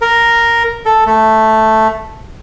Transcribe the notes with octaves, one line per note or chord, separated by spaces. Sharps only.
A#4
A4
A3